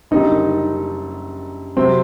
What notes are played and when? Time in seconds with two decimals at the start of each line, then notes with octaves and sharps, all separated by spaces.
0.11 F#1 F#2 D3 G3 D#4
1.76 C3 F#3 C4